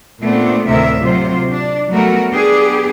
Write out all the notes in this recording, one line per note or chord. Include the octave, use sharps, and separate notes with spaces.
A#2 A3 B3 C4 D4
D2 A2 C3 D#3 A#4 E5
C3 F#3 F4 C5
D4
F#3 G3 A3 B3 F#4 A#4
B3 D4 G4 G#4